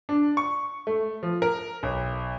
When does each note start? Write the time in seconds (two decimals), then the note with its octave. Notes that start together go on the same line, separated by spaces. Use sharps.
0.09 D4
0.37 C#6
0.87 A3
1.23 F3
1.42 A#4
1.83 B1